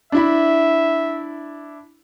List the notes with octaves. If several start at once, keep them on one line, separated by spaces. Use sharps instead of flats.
D4 E4 E5 B5